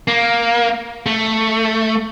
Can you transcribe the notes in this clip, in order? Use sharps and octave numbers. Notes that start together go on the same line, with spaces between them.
A#3
A3